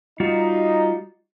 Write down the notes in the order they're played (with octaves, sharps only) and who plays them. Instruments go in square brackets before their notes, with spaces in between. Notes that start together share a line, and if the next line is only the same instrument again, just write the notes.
[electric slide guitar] G3 F4 F#4 [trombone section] D#4